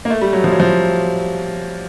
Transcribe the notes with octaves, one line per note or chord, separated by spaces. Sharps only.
A#3
A3
G3
F#3
F3
F#3
F3